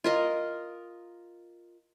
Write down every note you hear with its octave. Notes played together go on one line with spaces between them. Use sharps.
F4 A#4 D#5